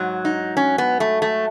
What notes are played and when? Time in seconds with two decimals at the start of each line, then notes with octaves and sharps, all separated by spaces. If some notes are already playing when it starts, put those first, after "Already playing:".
Already playing: G#2 F#3
0.25 D#4
0.57 C#4
0.78 B3
1.00 A3
1.22 A3